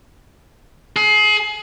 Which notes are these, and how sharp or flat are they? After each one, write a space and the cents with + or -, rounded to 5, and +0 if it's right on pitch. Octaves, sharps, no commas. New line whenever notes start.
G#4 +30